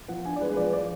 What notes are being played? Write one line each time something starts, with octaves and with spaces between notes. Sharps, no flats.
F3 F#5
D4 G#5
D5
G#3 B4
B4
F3 D5
F3 D5